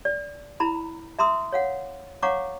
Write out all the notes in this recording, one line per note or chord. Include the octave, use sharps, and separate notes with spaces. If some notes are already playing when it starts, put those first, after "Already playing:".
D5
E4 A#5 B5
E5 A#5 C6 D#6 E6
C#5 F5 F#5
C#5 F5 F#5 A#5 C#6 D6